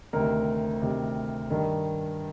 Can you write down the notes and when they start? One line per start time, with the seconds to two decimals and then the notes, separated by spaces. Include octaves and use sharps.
0.13 D2 C3 D#3 A#4
0.81 D2 C3 D#3
1.50 G2 D#3